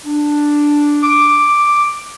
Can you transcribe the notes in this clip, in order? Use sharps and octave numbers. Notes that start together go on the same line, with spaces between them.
D4
D6